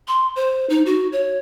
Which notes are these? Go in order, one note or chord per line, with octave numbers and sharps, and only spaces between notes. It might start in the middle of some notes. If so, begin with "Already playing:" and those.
C6
C5
D#4
F#4
C#5